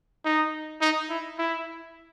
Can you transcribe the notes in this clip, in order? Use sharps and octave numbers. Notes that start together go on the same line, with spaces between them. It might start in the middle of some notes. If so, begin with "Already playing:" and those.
D#4
D#4
E4
E4